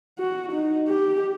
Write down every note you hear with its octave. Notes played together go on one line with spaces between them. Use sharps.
F#4
D#4
G4